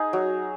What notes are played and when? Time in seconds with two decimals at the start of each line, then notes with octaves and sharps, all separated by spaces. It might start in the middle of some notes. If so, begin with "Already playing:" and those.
Already playing: D#4 G#4
0.13 F#3